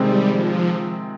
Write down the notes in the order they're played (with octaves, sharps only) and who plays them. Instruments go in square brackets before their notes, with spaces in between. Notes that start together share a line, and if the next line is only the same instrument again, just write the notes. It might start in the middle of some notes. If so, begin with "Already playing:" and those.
Already playing: [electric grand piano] C3 D#3 G#3 C4 [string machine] G3
[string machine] F3